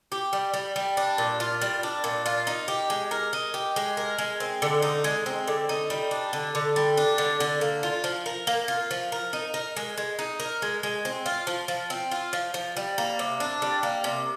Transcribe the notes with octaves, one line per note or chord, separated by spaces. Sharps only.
G4
G3
G3
G3
D4
A#2
F4
G3
D4
A#2
F4
D#4
G4
G#3
A#4
D#4
G4
G#3
A#4
G#3
C4
D3
D#4
G#3
C4
D3
D#4
G3
D4
D3
D3
G3
D4
D3
D3
A#3
F4
F3
A#4
A#3
F4
F3
A#4
D#4
A#4
G#3
G#3
D#4
A#4
G#3
G#3
C4
F4
F3
F3
C4
F4
F3
F3
G3
A#3
C3
D4
G3
A#3
C3